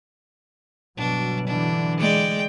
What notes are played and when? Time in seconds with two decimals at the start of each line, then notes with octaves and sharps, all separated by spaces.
0.97 G1 B2 F#3 D4
1.47 D3 E3 D4
1.99 G#3 D5 G5